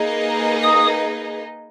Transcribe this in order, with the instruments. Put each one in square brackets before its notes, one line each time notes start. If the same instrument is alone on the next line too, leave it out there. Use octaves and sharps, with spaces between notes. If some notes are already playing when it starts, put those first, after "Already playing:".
Already playing: [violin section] A#3 D#4 G#4 B4 D#5
[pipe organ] D#6